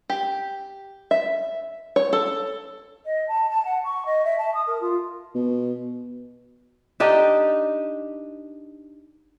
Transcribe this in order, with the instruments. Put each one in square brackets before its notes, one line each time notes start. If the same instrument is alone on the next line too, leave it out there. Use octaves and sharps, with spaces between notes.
[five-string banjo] G4
E5
C#5
A4
[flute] D#5
A5
A5
F#5
C#6
D#5
E5
A5
D#6
A#4
F4
[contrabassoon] B2
[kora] D4 D#4 G4 D#5